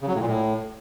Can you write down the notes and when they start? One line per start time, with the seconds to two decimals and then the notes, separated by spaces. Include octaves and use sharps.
0.01 C#3
0.08 F#3
0.14 A2
0.21 A#2
0.28 A2